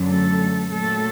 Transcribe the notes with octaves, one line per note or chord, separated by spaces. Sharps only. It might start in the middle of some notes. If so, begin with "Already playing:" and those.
Already playing: F#2 D3 F#3
A3 A4
A#2 F#3 A3 A4